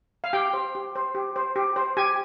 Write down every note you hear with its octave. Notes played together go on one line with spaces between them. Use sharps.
F5
G4 G5
C5
G4
C5
G4
C5
G4
C5
G4 G#5